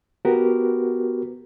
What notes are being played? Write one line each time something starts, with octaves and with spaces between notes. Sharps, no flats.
B3 F#4 G4 A#4 B4